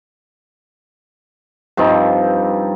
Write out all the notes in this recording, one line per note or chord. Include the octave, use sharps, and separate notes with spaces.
G2 F3 C4 D#4